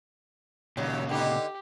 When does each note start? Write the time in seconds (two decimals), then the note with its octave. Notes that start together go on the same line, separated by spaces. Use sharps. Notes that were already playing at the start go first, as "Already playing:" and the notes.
0.77 D#2 A#2 C#3 F#3 G3
1.09 D3 B3 D#4 G4